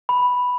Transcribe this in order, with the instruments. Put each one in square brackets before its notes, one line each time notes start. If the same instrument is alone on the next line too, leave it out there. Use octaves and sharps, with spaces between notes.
[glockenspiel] B5